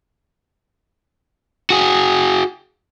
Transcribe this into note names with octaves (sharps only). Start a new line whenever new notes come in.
F#4 G#4